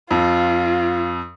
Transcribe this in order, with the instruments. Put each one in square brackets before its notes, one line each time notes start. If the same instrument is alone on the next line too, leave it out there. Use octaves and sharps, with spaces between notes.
[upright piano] F2 [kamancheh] F4